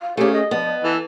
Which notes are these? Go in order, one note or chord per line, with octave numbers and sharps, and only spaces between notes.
F5
A3 A#3 C#4 G4 G#4 C5
G#4 D#5
G2 F3 B3 D#5
E3 A4